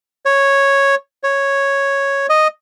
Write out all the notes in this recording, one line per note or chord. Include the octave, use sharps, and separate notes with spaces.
C#5
C#5
D#5